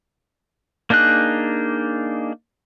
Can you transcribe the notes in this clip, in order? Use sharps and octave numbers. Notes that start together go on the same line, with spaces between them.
A#3 D4 D#4 G#4 F#6